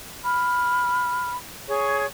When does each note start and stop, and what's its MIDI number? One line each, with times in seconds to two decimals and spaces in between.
0.24 1.37 83
0.24 1.31 89
1.68 2.05 68
1.68 2.05 73
1.68 2.05 85